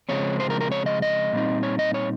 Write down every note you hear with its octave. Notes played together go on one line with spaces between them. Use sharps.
C#3 F3 G#3 C4 C#5
C5
A#4
A#4
C#5
D#5
D#5
A#2 G3 C4 D#4
C#5
D#5
C#5